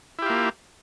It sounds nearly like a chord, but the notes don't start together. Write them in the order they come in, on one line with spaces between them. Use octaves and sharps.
E4 G4 F4 A#3